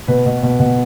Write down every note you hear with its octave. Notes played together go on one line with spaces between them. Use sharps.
B2 B4
B2
B2
B2